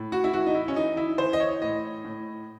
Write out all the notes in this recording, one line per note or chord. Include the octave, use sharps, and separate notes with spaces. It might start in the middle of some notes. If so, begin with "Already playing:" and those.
Already playing: A2
F#4
E4
E3 F#4
D#4
E4
C#4
E3 D#4
E4
E3 C5
D#5
C#5
A2 D#5
A2